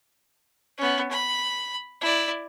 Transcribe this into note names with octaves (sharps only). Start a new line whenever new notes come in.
B3 C#4
B5
E4 D5